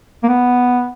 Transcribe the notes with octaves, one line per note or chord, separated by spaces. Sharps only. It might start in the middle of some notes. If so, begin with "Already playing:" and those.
A#3
B3